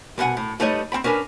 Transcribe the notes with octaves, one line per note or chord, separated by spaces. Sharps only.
C2 B2 F4 F#5 G#5
A2
G3 A3 D#4 B4 C#5 D#5
C4 C#4 G5 B5
C#4 D4 A#4 B4 G#5